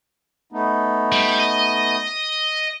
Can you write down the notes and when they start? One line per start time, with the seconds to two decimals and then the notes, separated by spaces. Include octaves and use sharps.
0.52 A3 B3 D#4
1.12 G3
1.39 D#5